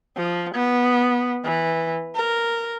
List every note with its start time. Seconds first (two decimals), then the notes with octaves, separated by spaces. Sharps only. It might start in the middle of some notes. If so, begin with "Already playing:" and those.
0.17 F3
0.55 B3
1.45 E3
2.16 A#4